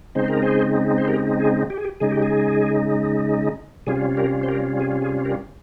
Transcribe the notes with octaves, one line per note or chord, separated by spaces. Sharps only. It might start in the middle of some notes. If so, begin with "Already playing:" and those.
C#3 G#3 C4 D#4 C5
A#4
G#4 C5
C5
G4 A#4
G#4
G4
G#4
G4
C#3 G#3 D#4 G#4
G4
G#4
C3 G3 C#4 F4 G#4
G4 A#4
C5
G4 A#4
G#4
G#4
G4 A#4